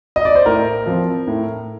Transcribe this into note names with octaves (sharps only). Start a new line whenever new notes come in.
D#5
D5
C5
A2 A#4
F3 C4
A2